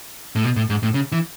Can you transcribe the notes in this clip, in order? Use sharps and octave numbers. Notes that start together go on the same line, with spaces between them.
A2
B2
A2
G#2
A2
C#3
E3